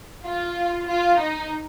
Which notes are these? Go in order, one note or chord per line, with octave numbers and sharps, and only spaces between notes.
F4
F4
D#4